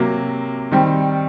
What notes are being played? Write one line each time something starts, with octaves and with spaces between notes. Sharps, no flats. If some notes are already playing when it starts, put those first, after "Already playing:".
Already playing: C3 F#3 A#3
D#3 G3 C4